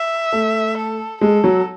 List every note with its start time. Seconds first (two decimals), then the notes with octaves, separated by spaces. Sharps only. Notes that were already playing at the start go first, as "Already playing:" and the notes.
Already playing: E5
0.32 A3
0.77 A4
1.21 G#3 A4
1.44 F#3